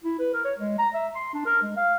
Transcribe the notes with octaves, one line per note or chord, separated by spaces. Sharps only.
E4
B4
A#4
C#5
G#3
A#5
E5
C6
D4
A#4
G#3
F5